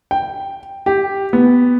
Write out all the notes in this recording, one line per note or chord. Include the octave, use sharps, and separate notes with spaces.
G5
G4
B3